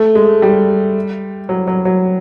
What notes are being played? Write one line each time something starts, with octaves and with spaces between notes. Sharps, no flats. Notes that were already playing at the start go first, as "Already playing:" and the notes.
Already playing: A3
G#3
G3
F#3
F#3
F#3